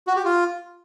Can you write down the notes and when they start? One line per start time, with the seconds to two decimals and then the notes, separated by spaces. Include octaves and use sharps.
0.07 F#4
0.16 G4
0.25 F4